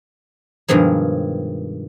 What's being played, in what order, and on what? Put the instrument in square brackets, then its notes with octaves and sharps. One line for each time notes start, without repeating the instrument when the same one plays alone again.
[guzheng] G2 B2 D#3 F3 G#3